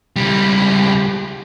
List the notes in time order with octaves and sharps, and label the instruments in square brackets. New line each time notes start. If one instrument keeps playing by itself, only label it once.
[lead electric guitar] C#2 G3